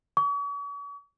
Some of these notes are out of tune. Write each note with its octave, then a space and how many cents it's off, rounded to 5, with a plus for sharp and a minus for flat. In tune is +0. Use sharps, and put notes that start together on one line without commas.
C#6 +45